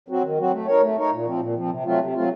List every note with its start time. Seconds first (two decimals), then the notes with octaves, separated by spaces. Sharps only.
0.08 F#3 C4 F#4
0.23 D#3
0.38 F#3 C4 F#4
0.52 A3
0.67 D#4 A#4 C#5
0.82 A3
0.96 D#4 A#4 C#5
1.11 A#2
1.26 F3 C4
1.40 A#2
1.55 F3 C4
1.69 C3
1.84 F#3 A3 C4 F4
1.99 C3
2.14 F#3 A3 C4 F4